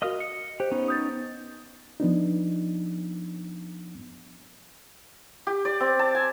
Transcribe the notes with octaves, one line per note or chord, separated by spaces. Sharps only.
F#4 A#4 D#5 F5 D#6 F6
C#7
G4 C5
B3 C#4 D#4
D#6 G6 A6
F3 B3 D4 D#4
G4
D5
C4
A5
G#5